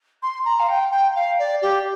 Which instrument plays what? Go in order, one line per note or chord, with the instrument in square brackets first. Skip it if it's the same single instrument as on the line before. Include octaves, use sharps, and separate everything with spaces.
[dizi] C6
A#5
F5
G5
G5
F5
D5
G4